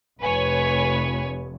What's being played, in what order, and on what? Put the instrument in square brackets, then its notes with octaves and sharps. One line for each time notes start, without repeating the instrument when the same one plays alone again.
[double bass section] F1 [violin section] B4 C#5 G#5